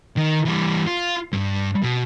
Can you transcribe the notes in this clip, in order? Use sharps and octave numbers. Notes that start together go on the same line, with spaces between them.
D#3
E3 G3
F4
G2
B2